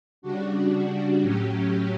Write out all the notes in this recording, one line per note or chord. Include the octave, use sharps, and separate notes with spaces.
C#3 G3 D4 F#4
F#4
A2 F#3 C#4 G4